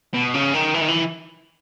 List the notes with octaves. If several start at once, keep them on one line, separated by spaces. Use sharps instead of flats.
B2
C#3
D#3
E3
D#3
E3